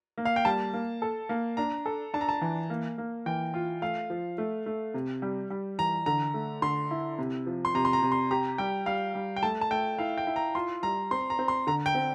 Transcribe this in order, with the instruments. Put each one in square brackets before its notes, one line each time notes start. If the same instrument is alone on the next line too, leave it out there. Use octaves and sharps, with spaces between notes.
[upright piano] A#3
[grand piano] F5
G5
[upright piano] G3 [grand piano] A5
[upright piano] A#3
A4
A#3
[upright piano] D4 [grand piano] A#5
[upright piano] A4
[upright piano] D4 [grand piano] A5
[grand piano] A#5
A5
[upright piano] E3
A#3
A#3
[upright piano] E3 [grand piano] G5
[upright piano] F4
[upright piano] A3 [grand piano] F5
[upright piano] F3
A3
A3
C3
G3
G3
[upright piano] E3 [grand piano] A#5
[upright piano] D3 [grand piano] A#5
[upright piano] A3
[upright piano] D3 [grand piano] C6
[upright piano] E4
C3
F3
[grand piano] C6
[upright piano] C3 [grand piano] A#5
[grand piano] C6
A#5
[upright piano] C3
[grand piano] C6
[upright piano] G4 [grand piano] A#5
[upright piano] G3 [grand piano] G5
[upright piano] G3 [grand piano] F5
[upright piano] G3
[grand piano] G5
[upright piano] A3 [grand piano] A5
[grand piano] A5
[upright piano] A3 [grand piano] G5
[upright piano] E4 [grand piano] F5
[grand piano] G5
[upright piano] E4
[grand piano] A#5
[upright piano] F4 [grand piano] C6
[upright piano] G3 [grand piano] A#5
[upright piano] C4 [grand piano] C6
[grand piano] A#5
[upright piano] C4
[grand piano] C6
[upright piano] D3 [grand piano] A#5
[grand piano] G5
[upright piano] C4